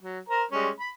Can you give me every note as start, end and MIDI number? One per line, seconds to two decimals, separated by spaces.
0.02 0.19 54
0.29 0.44 70
0.29 0.44 72
0.29 0.44 82
0.51 0.70 55
0.51 0.70 56
0.51 0.70 61
0.80 0.90 83